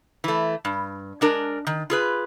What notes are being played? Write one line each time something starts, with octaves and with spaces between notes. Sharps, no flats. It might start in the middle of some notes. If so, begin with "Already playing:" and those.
E3 A3
G2
G#3 D4 A#4
D#3
F4 G#4 B4